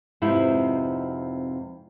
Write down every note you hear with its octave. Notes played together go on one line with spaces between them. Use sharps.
F2 G#2 C3 B3 D#4 E4